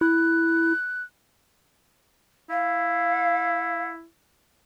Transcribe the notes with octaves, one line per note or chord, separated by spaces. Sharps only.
E4 F#6
E4 F5